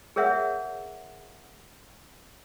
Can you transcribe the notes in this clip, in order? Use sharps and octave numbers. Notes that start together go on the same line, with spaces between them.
G#4 A#4 C#5 E5 F#5